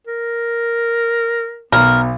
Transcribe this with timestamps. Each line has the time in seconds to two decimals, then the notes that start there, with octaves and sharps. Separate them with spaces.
0.07 A#4
1.72 B1 B3 A#4